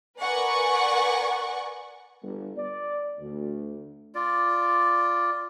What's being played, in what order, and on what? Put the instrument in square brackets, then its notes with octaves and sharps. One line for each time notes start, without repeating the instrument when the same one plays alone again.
[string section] A#4 B4 D5 F#5 G#5 C#6
[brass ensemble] G1
D5
D2
[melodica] F4 D5